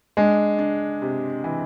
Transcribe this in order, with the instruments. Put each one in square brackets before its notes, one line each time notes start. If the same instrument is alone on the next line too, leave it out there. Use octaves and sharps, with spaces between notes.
[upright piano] G#3 [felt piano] D4
[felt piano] D4
C3
E3